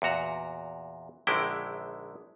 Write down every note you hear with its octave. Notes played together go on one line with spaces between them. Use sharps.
E2 A#2 F#4 A#5
A#1 D3 D#3 G#3 E4 G5